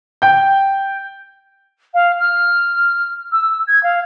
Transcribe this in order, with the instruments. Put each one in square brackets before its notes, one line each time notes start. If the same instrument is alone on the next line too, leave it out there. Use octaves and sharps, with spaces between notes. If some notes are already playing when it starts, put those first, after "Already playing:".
[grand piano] G5 G6
[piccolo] F5
F6
E6
G#6
F5